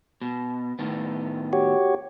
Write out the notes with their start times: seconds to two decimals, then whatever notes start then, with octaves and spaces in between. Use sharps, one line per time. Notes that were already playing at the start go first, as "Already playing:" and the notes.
0.21 B2
0.79 A2 D#3 B3
1.53 F#4 G4 C#5